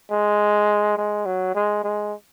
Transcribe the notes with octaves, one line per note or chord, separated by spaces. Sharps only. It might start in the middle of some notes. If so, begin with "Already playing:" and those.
G#3
G#3
F#3
G#3
G#3